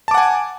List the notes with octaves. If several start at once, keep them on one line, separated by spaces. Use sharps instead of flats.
F#5 G#5 A5 D6